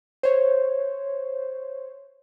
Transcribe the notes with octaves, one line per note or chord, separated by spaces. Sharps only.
C5 C#5